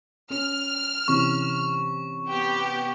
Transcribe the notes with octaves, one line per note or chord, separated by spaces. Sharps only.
C#4 F6
C3 E3 C#4 C#6
B3 G4